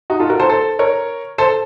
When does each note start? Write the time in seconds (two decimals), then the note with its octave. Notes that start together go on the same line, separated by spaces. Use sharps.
0.10 D#4 F#4
0.20 F4 A4
0.30 F#4 A#4
0.39 A4 C5
0.49 A4 C5
0.79 A#4 C#5
1.38 A4 C5